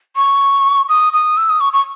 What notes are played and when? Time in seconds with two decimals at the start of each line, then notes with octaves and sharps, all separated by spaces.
0.16 C#6
0.89 D#6
1.13 D#6
1.37 E6
1.50 D#6
1.60 C#6
1.73 C#6